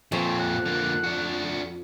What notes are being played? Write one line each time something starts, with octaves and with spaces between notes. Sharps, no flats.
F2 A#2 C4 C#5
F#5
D3 A#3
D4 F#4